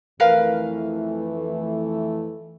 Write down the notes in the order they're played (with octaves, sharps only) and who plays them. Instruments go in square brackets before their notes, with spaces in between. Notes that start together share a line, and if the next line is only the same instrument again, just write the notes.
[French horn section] F2 E3 A3 [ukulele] A#4 B4 F5